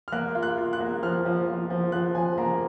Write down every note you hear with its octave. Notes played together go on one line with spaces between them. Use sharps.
F6
A#3 F#6
F4
F#6
F4
F#6
A#3
F3 F6
F3
F3
F3
F3 F#6
F3 G#5
A#3 A#5